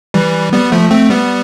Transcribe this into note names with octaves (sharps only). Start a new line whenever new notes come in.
E3 G3
G3 B3
F3 A3
A3 C4
G3 B3